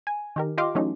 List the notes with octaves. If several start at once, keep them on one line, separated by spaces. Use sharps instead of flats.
G#5
D#3 G4 A#4
F4 G4 D#5 F5 C6 D6
E3 F#3 A3 C#4 D#4